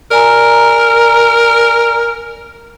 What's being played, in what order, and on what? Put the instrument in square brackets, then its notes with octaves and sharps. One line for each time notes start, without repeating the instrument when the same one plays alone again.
[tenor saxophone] A#4 [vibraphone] D5 G#5 A#5